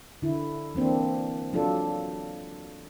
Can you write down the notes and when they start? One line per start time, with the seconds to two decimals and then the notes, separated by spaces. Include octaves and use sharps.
0.22 D3 E4
0.75 E3 A#3 C4 D4
1.53 F#3 D4 F4 A4